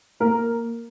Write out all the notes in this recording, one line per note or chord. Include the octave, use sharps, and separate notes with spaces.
A#3 A#4